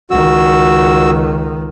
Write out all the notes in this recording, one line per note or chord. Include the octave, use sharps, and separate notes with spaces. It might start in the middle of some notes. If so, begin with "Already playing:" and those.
C#2 D#3 F#4 E6